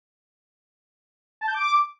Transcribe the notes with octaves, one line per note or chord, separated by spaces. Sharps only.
A5
G6
D6